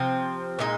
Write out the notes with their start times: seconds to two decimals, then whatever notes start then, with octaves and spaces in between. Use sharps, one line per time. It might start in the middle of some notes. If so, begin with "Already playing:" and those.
Already playing: C3 F3 C4
0.59 A#2 G#3 D#4